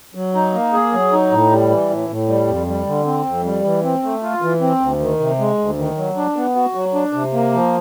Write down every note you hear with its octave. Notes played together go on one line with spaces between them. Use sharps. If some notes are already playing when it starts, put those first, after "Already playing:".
F#3
D#4
A#3
G#4
F#3
D#4
A2
G3
E3
A2
A2
G3
F2
G3
D3
C4
F2
G3
E3
C4
A3
F4
E3
C4
D2
D#3
C3
G#3
D2
D#3
F#3
D4
B3
F#4
F#3
D4
C3
A#3
F3